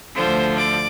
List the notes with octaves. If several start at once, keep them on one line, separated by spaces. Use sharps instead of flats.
D2 D3 F3 C5
D5